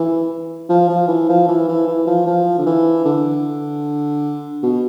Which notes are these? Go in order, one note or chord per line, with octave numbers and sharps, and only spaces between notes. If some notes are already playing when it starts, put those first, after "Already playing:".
Already playing: E3
F3
F3
E3
F3
E3
E3
E3
F3
F3
D3
E3
D3
B2